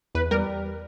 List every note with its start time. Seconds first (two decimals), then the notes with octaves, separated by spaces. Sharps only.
0.15 E2 B4
0.31 G3 A#4